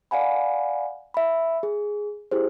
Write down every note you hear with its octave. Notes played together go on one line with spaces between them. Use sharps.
D5 F5 F#5 G#5 B5
E5 B5
G#4
E4 G4 G#4 C5